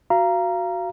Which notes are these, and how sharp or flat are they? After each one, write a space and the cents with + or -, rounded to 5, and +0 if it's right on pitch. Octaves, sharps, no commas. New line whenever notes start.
F#4 +0 F5 -25 A#5 +5